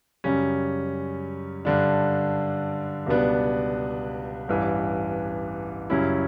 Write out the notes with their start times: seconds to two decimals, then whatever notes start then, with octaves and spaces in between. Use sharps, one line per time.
0.24 F#2 C#3 G3 C#4
1.65 G2 D3 G3 D4
3.06 C#2 B2 G3 B3 D4
4.48 A1 G2 E3
5.90 F#2 C#3 G3 C#4 E4